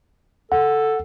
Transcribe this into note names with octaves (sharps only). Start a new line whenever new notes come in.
A4 F#5